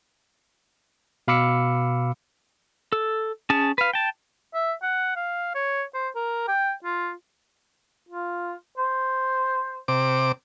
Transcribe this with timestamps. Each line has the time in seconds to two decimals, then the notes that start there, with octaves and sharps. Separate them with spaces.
1.28 B2 F5 B5 D6 E6 C#7
2.92 A4
3.50 C#4 G#4 A5
3.78 B4 F5
3.94 G5 A5
4.54 E5
4.82 F#5
5.16 F5
5.55 C#5
5.94 C5
6.15 A#4
6.48 G5
6.84 F4
8.09 F4
8.78 C5
9.88 C3 D6